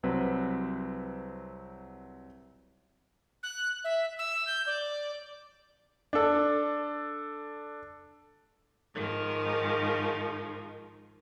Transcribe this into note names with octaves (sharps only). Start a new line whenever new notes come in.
C2 F#3 C4 B4
F#6
E5
E6
G6
D5
D4 A4
G#2 D#3 F3